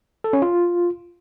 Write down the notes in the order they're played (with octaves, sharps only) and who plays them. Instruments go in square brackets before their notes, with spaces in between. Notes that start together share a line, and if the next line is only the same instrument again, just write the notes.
[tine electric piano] A4
C#4
F4